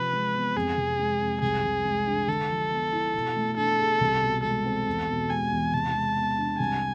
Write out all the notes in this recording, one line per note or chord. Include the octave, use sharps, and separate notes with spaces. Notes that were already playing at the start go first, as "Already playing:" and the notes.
Already playing: C3 F3 B4
G#3
B3
F2 G#4
C3
G#3
F2
C2 G#4
C3
G#3
D4
D3 A4
F3
B3
E4
B2
A3
D4 A4
G#4
C2
B2
G#3 A4
C4
E2
B2
G#3 G#5
E2
C3 A5
G#3
B3
D4
C2 G#5